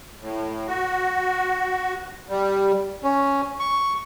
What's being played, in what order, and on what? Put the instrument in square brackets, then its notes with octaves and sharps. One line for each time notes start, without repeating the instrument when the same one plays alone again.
[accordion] A2
F#4
G3
[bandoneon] C#4
C#6